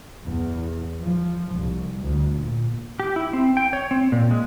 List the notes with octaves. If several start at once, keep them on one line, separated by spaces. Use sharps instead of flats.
E2
F3
C2
D2
A#2
G4
E4
C4
G5
C#5
C4
A#2
G#3